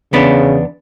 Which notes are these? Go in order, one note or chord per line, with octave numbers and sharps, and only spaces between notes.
E2 C#3 B3 D4